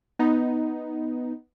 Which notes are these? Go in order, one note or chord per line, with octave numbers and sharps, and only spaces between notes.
B3 D#4